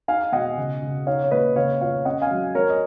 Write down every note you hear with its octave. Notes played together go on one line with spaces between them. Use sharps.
D#4 F5 G#5
B2 D#5 F#5
C#3
C#3
D#4 C#5 F5
C#5
A#2 B4 D#5
C#3 C#5 F5
F4 C#5 F5
C#4 D#5 F#5
F5 G#5
F#3
F#3 A#4 C#5
D#5